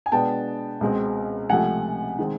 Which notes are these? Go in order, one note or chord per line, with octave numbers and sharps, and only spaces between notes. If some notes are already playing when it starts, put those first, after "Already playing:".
G#5
B2 G#3 B3 D4 G5 A5
C#2 B2 G#3 C4
C#2 C3 F3 A3 F#5 G#5
D#3 G#3 C4